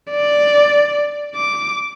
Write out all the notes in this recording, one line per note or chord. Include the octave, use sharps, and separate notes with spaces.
D5
D6